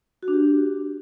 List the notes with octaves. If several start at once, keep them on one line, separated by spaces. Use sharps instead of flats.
F#4
D4
G4